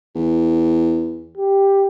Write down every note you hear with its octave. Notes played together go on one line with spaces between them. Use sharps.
E2
G4